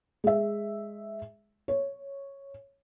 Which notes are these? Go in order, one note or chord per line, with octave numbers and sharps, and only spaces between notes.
G#3 E5
C#5